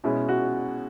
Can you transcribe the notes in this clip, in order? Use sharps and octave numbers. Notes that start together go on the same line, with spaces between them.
B2 G#3 C#4 E4
F#4